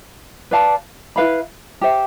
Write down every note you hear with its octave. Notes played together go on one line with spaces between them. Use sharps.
B4 D5 F5 A5
E4 B4 F5 B5
G4 C5 E5